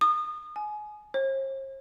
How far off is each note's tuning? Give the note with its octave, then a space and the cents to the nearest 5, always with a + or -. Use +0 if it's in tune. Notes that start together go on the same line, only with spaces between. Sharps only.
D#6 -30
G#5 +25
C5 +45